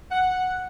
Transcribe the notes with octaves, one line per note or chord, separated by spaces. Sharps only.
F#5